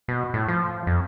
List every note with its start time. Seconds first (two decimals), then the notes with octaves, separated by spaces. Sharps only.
0.08 B2
0.34 A2
0.48 F3
0.87 F2